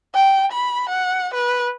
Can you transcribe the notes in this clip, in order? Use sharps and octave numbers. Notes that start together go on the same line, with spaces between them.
G5
B5
F#5
B4